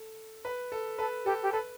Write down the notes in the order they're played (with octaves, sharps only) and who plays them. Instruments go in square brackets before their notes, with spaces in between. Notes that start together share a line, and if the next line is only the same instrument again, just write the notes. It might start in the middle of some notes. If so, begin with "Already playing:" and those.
Already playing: [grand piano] A4
B4
A4
[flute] A4 [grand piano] B4
[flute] G4 [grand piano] A4
[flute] G4
[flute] A4 [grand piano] B4